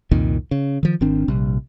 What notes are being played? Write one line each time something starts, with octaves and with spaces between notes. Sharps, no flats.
C2 F2 A#2 D#3
C#3
D#3 F3
G#1 D#3 C4 D4
A#1 C3 G3